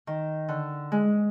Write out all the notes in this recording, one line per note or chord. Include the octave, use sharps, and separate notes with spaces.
D#3
D3
G#3